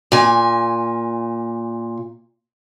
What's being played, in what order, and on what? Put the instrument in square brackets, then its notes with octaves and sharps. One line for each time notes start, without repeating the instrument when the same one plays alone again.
[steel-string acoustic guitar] A#2 G#5